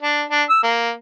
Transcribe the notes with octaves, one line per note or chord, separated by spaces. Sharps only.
D4
D4
E6
A#3